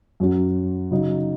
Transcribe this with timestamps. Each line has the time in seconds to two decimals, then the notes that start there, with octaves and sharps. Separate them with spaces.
0.20 F#2 F#3 C#4 F#4
0.91 C#3 F#3 D#4 F#4